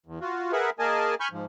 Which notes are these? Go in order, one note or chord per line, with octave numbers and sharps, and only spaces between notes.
E2
F4 F#4
G#4 A#4 B4 E5 F#5
A#3 G#4 A#4 D#5 G#5 A5
G#5 B5 C#6 F6 G6
G#2 F3